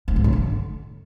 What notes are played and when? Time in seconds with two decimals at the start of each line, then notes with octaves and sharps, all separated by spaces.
0.08 C3
0.16 G#2
0.24 C#3
0.33 D3